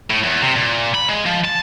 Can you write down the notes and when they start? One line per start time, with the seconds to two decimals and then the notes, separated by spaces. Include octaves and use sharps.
0.11 A2
0.24 E2
0.42 C3
0.56 A#2
0.94 B5
1.08 G#3
1.26 F3
1.44 A5